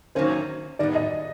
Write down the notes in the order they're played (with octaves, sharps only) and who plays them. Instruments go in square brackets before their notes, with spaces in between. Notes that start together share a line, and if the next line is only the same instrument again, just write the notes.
[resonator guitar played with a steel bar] D#3 F#3 A#3 C#4 [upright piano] C5
[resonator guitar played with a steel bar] D#3 G3 B3 [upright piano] D5
[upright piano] D#5